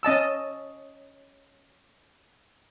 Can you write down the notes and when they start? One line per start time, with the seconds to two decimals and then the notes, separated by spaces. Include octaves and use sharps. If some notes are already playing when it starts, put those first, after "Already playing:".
0.03 C#4 D#5 A5 E6